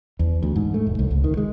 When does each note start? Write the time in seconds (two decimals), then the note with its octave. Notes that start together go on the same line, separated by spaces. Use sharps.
0.19 E2
0.42 D2
0.56 G#2
0.74 A3
0.87 E1
0.99 C2
1.11 C#2
1.24 D#3
1.37 G#3